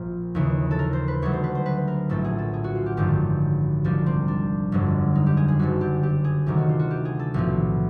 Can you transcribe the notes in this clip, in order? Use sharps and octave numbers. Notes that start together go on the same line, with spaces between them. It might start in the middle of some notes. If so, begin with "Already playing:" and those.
Already playing: A#1 A#2 F3 F4
D#2 C#3 E3
A4
A#4
C5
B4
D2 D3 F#3 C#5
C5
B4
C5
B4
A#4
A#1 A2 F#3 A4
G#4
A4
G#4
F#4
F4
G4
G#1 F#2 D3 F3 G4
C2 C3 F3 D4
C4
D4
G1 F2 D3 F#3
D#4
G4
G#4
G#4
F#1 F#2 D3 F#4
G4
G4
G#4
D2 C3 D#3 F#3 G4
F#4
F4
F#4
G4
G#4
A4
B1 A2 F3